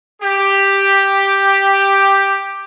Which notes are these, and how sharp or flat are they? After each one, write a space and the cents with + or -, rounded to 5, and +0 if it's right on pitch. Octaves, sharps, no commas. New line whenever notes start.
G4 +5